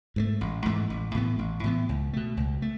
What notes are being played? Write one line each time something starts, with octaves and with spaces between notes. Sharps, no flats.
G#2 E3 A3
A1
G#2 E3 A3
A1
A2 E3 B3
A1
A2 E3 B3
C#2
B2 A3
C#2
A3